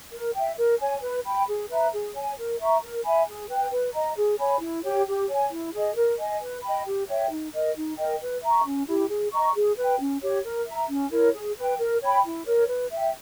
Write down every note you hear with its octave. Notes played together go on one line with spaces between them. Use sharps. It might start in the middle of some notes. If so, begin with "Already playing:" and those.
A#4
E5 G5
A#4
C#5 G#5
B4
G5 B5
G#4
B4 E5 A#5
G#4
C#5 G#5
A#4
E5 A#5 C#6
A#4
E5 G#5 B5
G#4
B4 G5
B4
D#5 A#5
G#4
C#5 G#5 B5
E4
G4 C#5 G5
G4
C#5 G#5
E4
G#4 D#5
A#4
D#5 G#5
B4
D#5 G5 B5
G4
C#5 E5 G5
D#4
A#4 D#5
D#4
A#4 D#5 G5
B4
E5 A#5 C#6
C#4
E4 G4
G#4
D#5 A#5 C#6
G#4
B4 G5
C#4
G4 C#5
A#4
E5 A#5
C#4
E4 A#4 C#5
G#4
B4 G5
A#4
C#5 G5 B5
E4
A#4 C#5
B4
E5 G5